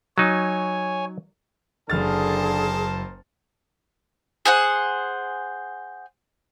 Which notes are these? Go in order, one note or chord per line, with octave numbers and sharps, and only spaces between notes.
F#3 D#4 C#5 G#5
F#1 D3 G#4 A#4 C5 A5 F6 A6
G#4 C5 F#5